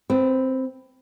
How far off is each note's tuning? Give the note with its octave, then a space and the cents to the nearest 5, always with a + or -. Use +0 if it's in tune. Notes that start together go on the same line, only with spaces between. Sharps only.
C4 +0 B4 +15